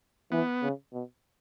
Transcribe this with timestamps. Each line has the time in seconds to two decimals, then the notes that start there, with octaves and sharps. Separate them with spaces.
0.32 E3 B3
0.63 C#3
0.93 B2